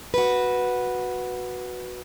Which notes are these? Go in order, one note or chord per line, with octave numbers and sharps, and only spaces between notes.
F#4 B4